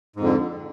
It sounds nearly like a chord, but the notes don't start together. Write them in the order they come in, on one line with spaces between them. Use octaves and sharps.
G#2 F2 D3